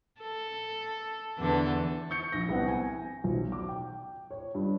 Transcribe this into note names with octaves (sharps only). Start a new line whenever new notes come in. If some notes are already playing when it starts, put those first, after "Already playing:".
A4
E2 D3 A4
C#6 G6 C#7
A#1 A#6
C2 B3 C4 F#5
G#5
B1
D6
G5
C#5
G2